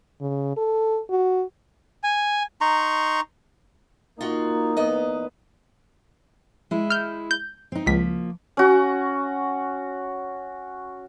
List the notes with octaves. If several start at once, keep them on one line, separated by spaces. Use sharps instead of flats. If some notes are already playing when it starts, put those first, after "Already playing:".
C#3
A4
F#4
G#5
D#4 A#5 C6 C#6
A#3 D#4 F4 F#4
E2 B3 D#5
G#3 E4
F6 G6
G6
C4 D#4
C#2 F3 A#3 B6
C#4 F#4